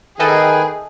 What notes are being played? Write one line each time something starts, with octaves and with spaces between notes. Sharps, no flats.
D#3 G#4 A4 B4 D#5 E5 G5 G#5